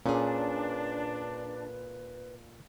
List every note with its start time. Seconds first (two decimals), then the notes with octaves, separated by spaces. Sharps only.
0.06 A#2 C#4 D4 G#4 B4